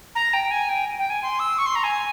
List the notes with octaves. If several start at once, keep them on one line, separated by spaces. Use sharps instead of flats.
A#5
G5
G#5
G5
G5
G#5
C6
E6
C#6
C6
A#5
G#5